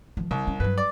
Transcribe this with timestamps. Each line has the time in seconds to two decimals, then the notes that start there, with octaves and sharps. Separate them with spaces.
0.17 D#3 F3
0.31 C2 C#3
0.47 D#3 C#4
0.60 G2 F#3 B4
0.78 D5